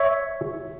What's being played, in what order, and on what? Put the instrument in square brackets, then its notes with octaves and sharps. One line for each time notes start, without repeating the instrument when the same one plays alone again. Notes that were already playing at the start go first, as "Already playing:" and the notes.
Already playing: [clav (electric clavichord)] C#5 E5